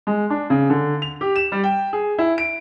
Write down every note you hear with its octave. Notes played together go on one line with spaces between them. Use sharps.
G#3
D4
C#3
D3
F7
G4
E7
G3
G5
G#4
E4
D7